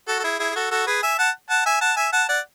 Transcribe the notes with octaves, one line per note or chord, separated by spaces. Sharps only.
F#4 A4
A4
E4 G#4
E4 G#4
G#4
F#4 A4
F#4 A4
G#4 B4
E5 G#5
F#5 A5
F#5 A5
E5 G#5
F#5 A5
E5 G#5
F#5 A5
D5 F#5